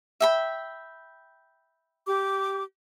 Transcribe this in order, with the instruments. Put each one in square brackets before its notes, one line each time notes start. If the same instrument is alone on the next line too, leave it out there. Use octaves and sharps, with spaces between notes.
[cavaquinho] E5 G5 B5
[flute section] G4 D6